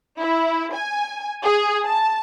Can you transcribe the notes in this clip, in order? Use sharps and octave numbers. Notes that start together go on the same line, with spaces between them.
E4
G#5
G#4
A5